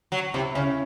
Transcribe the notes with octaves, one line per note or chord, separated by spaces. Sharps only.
F#3
C3 E4
C#3 C#4